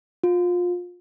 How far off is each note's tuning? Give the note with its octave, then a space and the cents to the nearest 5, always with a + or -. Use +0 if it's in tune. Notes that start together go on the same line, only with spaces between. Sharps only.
F4 +25